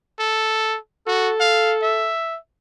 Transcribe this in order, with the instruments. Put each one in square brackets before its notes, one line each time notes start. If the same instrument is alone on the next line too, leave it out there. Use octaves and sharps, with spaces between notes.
[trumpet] A4
[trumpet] F#4 [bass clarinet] A4
[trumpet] F5
E5